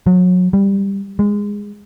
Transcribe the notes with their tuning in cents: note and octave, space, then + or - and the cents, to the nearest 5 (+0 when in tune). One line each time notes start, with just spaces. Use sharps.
F#3 -30
G3 +10
G#3 -15